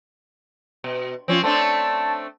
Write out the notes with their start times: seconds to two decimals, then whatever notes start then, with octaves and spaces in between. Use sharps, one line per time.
0.84 B2
1.28 F3 C4 C#4
1.43 A3 C4 D4 A5